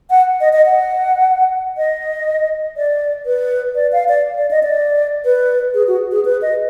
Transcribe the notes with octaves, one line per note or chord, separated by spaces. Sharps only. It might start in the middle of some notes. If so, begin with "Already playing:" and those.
F#5
D#5
D#5
F#5
D#5
D5
B4
D5
F5
D5
D5
D#5
D5
B4
G#4
F#4
G#4
B4
D#5